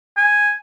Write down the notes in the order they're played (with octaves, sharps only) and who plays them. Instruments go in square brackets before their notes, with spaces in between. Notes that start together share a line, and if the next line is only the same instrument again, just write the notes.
[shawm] G#5